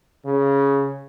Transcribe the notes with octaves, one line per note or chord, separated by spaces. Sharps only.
C#3